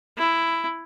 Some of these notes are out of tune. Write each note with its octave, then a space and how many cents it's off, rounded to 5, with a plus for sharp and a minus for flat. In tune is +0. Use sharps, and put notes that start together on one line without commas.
E4 +10